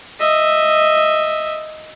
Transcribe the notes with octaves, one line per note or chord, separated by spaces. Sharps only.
D#5 E5